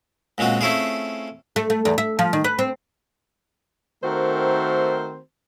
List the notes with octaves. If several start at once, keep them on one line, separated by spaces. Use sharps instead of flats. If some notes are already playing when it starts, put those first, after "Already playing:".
C#2 A#2 G#3 C4 F#4
A3 C4 C#4 E4 F4 G#4
A3
A3
E2
E5
F3
D#3
B4
C4
D#3 A3 C4 F#4 A#4 C5